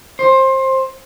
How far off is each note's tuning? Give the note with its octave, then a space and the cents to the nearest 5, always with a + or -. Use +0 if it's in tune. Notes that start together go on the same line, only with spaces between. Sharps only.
C5 +20